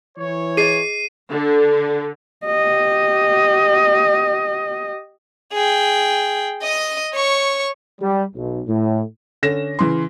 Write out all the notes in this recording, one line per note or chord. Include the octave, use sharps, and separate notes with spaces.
E3 C#5
G#4 D#5 C7 D#7
D3
G4 D#5
G#4 G5
D#5 D#6
C#5 C#6
G3
B1
A2
D3 C#4 A#6 E7
C#3 E3 C6